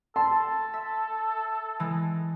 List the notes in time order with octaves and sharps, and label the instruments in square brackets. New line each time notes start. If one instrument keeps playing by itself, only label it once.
[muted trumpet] A4 [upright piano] A5 [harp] C6
[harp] E5
E3 G#3